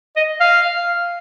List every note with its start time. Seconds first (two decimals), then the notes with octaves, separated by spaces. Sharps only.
0.16 D#5
0.40 F5